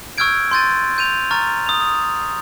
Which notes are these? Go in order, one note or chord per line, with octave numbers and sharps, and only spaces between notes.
C#6 E6 F6 G6 G#6 D7
C6 G6 A6 D#7
G6 D#7 F7
A#5 C#6 F6 A6
D#6 F7
D#6